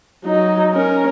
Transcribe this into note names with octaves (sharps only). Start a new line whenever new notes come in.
F#3 D#4
C#4 A#4